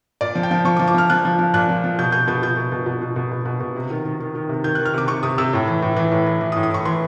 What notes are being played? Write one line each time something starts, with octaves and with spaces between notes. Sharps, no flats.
A#2 D5
F3
G5
F3
F3 C#6
D6
F3
D6
F3 F6
F3 F#6
F3
F3
A#2 F#6
F3
F3
B2 G6
B2 G6
B2 G6
B2 G6
B2
B2
B2
B2
B2
B2
B2
B2
C3
D#3
D#3
D#3
D#3
C3
D#3 G6
D#3 F#6
F6
C3 D6
C3 C#6
C3 D#6
C3 E6
A2
E3
A2
E3
A2
E3
E3
D#6
A2
D#6
A2 C#6
E3 C6